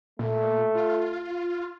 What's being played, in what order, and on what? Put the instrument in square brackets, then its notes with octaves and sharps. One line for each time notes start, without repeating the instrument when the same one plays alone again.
[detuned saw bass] A#2 [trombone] A3
[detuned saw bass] F4